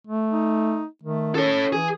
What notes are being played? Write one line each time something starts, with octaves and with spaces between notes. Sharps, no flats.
A3
D#4
D#3 A3
C#4 A4 C#5
E3 G#4